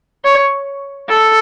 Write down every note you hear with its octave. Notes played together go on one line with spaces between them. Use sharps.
C#5
A4